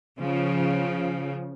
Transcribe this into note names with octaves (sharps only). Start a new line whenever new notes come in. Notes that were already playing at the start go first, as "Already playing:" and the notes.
C#3 F3